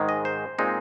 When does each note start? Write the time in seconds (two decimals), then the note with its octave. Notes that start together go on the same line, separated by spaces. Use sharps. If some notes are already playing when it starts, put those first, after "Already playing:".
Already playing: G#2 D#3 G#3
0.09 D#5
0.25 C5
0.58 A#2 G#3 C4 D#4